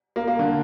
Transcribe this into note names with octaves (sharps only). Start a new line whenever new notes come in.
A#3
A#3
D3